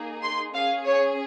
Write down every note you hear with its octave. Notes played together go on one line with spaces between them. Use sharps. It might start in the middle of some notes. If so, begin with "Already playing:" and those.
Already playing: A#3 D#4 G#4
C6
C#4 G#4 F5
C#5